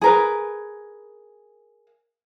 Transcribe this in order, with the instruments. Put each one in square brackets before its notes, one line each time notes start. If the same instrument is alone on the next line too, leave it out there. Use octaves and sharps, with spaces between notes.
[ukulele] G#4 A#4 B4